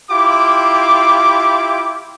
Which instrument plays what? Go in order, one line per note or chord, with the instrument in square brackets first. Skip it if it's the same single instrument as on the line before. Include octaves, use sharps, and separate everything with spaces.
[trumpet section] E4 F4 G4 D6